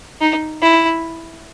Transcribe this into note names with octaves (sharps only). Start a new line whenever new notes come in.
D#4
E4